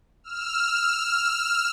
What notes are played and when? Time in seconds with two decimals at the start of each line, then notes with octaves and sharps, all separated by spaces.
0.24 E6 F6